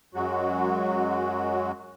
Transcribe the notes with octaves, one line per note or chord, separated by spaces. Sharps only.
F#2 F#3 G#3 F#4